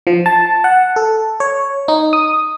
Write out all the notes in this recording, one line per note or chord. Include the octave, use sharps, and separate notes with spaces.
F3
A5
F#5
A4
C#5
D#4
D#6